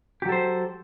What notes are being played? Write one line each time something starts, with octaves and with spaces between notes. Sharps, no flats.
F#3 G4 A4 C5